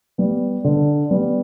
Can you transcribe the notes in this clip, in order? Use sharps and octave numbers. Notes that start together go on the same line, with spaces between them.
G3 B3
D3
G3 B3